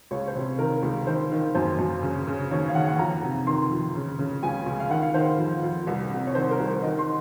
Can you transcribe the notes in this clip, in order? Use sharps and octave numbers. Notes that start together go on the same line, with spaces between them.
C#2 C#5
C5
C3
D#3 A#4
C#2
D#3 C5
D#3
F#2 C5
F#2
C#3
C#3
D#2 C#5
F5
D#2 F#5
F#5
F2 A#5
C3
D#3 C6
F2
C#3
C#3
C#2 G#5
C#2
F5
D#3 F#5
F5
D#3 C5
F2
F2
C2
C3
C#5
D#3 C5
A#4
C2
C5
D#3 D#5
C6